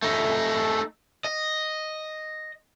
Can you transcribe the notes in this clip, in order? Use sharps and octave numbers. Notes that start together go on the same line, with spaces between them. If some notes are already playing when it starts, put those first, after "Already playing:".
A3 D#4
D#5